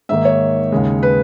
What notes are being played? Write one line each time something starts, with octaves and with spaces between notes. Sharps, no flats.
G#2 D#3 A#3 E5
C#5
D#2 C#3 G#3
B4